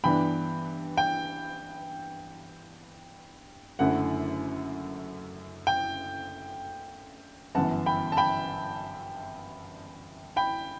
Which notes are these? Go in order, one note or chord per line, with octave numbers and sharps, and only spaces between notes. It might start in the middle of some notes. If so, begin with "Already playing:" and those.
G2 E3 B3 D4 G5 B5
G5
F#1 F#2 D3 A3 E4 F#5
G5
G1 F#2 E3 B3 F#5 A5
G5 B5
A5
G5 B5
G5 B5